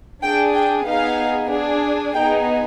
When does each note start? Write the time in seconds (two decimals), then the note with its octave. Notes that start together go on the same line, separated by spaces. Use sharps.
0.22 D4 G#4 G5
0.54 G5
0.86 B3 D#4 G#4 F5
1.51 D4 G#4
2.14 B3 D#4 G#4 G5